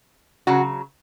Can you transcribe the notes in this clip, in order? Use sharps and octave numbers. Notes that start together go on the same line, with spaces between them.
C#3 F#3 F#4